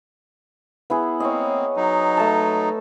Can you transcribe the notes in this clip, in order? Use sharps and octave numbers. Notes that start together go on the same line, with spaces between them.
B3 E4 G#4
A#3 C4 C#5 D#5
F#3 D#4
A3 A5